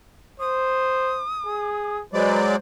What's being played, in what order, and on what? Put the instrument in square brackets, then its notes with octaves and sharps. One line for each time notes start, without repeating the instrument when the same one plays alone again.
[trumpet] C5 [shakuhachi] D#6
[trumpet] G#4
[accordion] F#3 G#3 D5 [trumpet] B4 [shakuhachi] C5